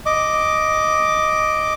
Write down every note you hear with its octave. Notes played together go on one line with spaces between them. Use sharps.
D#5 D6